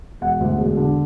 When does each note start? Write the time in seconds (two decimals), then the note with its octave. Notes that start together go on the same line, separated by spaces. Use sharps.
0.21 E1 F#5
0.40 D2
0.58 E1
0.77 D3